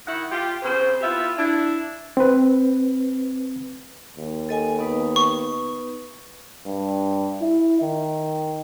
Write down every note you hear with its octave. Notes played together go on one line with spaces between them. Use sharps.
D#3 E4 F#5
F4 G4
C#3 C4 C5
B3 E4 F4 G4 E5
D4 E4
C4 B4
D#2
A4 D#5 G#5
B3 D#4 B4
C#6
G2
E4
D#3